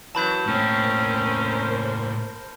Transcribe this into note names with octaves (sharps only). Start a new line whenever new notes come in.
F#2 E3 F#3 A5 B5 G6
A2 A#3 C4 C#4 A#4 C5